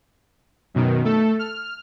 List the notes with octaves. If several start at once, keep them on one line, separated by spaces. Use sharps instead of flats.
F#2 B2 D#3
A3 A4
F6